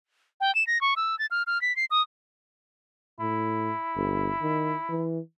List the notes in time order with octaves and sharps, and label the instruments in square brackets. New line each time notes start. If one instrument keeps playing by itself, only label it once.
[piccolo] G5
E7
A#6
C#6
E6
A6
F6
F6
B6
C7
D#6
[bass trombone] A2 [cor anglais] E4
[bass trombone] G1
D#3
E3